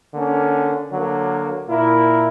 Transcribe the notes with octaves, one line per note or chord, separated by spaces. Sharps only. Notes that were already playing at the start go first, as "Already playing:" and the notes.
D3 A#3 C#4
D3 F#3 A#3
A#2 A#3 E4 A#4